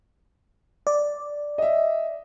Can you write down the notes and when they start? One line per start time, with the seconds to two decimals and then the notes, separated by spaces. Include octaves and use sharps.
0.87 D5
1.58 D#5 E5